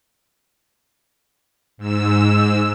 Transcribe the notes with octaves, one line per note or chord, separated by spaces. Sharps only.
G#2 E6